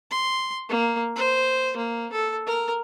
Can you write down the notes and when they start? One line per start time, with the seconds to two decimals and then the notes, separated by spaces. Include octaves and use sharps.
0.11 C6
0.69 A#3
1.16 C5
1.76 A#3
2.12 A4
2.46 A#4